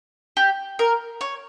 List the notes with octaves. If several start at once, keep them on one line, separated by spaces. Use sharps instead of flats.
G4
A#4
C#5